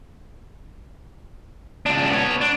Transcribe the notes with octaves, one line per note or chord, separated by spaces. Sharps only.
C#2 D4
B3 C#5
D4